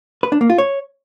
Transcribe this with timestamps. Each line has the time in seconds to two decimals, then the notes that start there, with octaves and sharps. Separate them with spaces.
0.23 B4
0.32 D4
0.41 A#3
0.50 F4
0.58 C#5